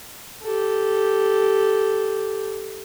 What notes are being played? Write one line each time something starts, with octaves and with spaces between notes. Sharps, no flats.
G4 A4